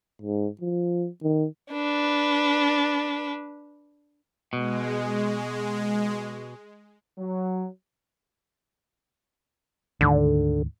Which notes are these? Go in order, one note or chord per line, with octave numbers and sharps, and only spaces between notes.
G#2
F3
D#3
D4 B4
B2 G#3
F#3
D2 G#2 D3 D#3